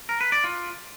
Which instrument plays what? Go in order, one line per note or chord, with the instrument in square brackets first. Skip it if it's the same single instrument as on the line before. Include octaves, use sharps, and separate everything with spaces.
[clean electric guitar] A#4
B4
D5
F4